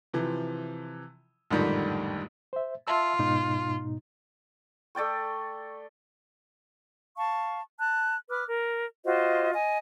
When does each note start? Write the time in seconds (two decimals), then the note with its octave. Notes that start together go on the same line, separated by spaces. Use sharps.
0.14 C3 E3 F3
1.51 A1 F2 G#2 D3 D#3 G3
2.53 C5 E5
2.87 F4 E5 A5 E6
3.19 G#2 B2 D#4
4.95 A3 D5 G5 C#6
7.17 F5 A5 C#6
7.78 A5 F#6
8.30 B4 D6 F6 F#6
8.48 A#4
9.04 F4 F#4 C5 D#5
9.53 D#5 G#5